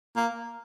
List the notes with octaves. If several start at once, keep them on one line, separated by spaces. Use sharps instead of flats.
A#3